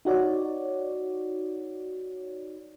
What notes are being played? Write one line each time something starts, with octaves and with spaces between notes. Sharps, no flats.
D#4 F#4 C#5 D5